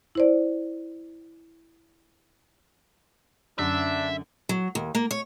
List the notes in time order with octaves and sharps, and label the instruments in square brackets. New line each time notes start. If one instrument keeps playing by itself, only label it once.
[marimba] E4 C5 D5
[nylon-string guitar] F#2 D3 G#4 [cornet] D4 [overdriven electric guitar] E5
[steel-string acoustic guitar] F#3
D#2
A#3
C#5